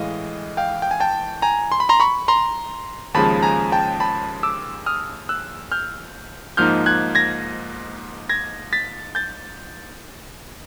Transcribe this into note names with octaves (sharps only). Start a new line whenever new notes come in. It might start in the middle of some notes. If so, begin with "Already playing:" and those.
Already playing: A2 E3 G#3 D#5 F5
F5 G5
G5
G#5
G5 A5
G#5 A#5
C6
B5
A#5 C6
B5 C#6
A#5 C6
D#2 C#3 F3 G#3 A5 B5
G#5 A#5
G5 A5
A5 B5
D6 E6
D#6 F6
E6 F#6
F6 G6
G#2 F3 A#3 D#4 F6 G6
F#6 G#6
G#6 A#6
G#6 A#6
A6 B6
G6 A6